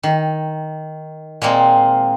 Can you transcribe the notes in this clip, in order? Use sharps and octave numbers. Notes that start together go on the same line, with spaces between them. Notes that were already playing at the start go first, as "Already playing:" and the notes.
D#3
A#2 G#3 A#3 C4